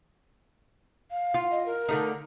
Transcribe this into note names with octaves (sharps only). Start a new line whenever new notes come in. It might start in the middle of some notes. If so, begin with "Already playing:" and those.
F5
F4
D#5
A#4
D3 A3 D#4